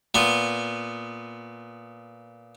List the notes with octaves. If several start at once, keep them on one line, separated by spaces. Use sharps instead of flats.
A#2 B3